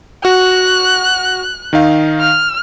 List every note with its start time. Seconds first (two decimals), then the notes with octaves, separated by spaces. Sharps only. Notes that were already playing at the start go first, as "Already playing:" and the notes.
0.25 F#4 F#6
1.73 D#3 D#4 F5
2.20 F6